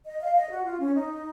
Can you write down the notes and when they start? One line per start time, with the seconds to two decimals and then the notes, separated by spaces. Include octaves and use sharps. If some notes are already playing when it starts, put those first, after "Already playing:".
0.05 D#5
0.20 F5
0.35 D#5
0.50 F#4
0.64 F4
0.80 C#4
0.95 D#4